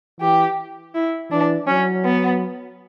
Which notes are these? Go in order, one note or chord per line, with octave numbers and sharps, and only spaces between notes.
E3 G4
E4
E3 D4
F#3 C#4
B3